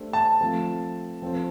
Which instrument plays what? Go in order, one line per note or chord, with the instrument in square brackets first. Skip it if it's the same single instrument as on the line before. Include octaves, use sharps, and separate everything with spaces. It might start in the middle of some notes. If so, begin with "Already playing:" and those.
Already playing: [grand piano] A3 D4 G4 C5
[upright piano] A5
[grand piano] F3 A3 C4
F3 C4 A4 C5